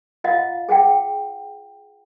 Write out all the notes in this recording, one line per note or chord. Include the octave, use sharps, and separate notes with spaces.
F4 C5 D#5 F5 F#5
G#4 C5 F#5 G5